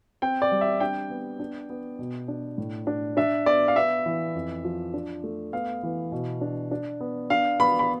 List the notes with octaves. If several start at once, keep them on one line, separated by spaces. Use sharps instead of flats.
C4 G5
D5
G3
E5
D4 G5
B3
D4
B3
B2
D4
A2
D4
D4 E5
B3 D5
F5
B3 E5
E3
F2
F3
D4
A3
B3 F5
E3
B2
D4
D4
B3
D4 F5
B3 B5
B5